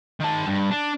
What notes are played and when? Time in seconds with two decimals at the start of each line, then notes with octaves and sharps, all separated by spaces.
0.20 D#3 A5
0.47 G2
0.71 D4